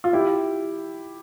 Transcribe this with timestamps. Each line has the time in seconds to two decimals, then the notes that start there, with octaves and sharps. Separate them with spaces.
0.04 F4
0.13 E4 G4